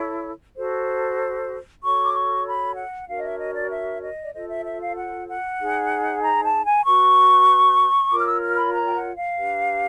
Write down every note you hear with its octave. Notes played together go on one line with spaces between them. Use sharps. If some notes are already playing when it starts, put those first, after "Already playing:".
Already playing: E4 A4 C#5
F#4 A4 C5
F#4 A4 C#5 C#6
D6
C#6
B5
F#5
D4 F#4 A#4 C#5 F5
D#5
E5
D#5
D5
E5
D#5
D5
F4 A4 C5 D#5
E5
E5
F5
F#5
F#5
D#4 G#4 C5
A#5
A5
G#5
F#4 B4 C#6
F4 A#4 C#5 D6
F6
E6
F6
B5
A#5
G5
F#5
F5
D4 G4 B4